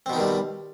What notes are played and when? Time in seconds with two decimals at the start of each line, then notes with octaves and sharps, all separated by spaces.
0.06 C4
0.10 B2
0.13 D#4
0.17 D#3
0.20 G3